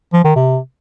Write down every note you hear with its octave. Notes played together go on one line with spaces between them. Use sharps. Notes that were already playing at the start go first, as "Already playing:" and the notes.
F3
D#3
C3